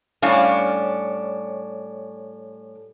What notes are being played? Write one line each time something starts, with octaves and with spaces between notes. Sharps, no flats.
A2 G3 C#4 D4 F5